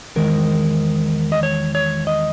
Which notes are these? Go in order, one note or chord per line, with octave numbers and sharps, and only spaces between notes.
E2 D#3 G#3 A#4
D#5
C#5
C#5
D#5